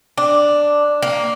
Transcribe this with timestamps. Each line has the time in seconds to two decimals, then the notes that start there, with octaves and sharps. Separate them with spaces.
0.18 D4
1.02 A#3